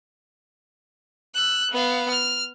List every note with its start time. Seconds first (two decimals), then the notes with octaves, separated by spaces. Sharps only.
1.35 E6 F#6
1.71 B3 F5
2.11 F6